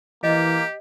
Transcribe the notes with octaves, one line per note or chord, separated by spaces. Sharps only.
E3 A#3 G4 D#5